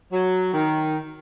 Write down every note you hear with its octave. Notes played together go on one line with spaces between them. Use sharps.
F#3
D#3